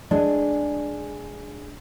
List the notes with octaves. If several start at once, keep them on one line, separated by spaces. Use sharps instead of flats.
G#3 D4 G#4